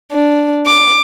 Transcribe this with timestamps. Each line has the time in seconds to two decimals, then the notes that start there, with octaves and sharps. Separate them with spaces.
0.12 D4
0.66 D6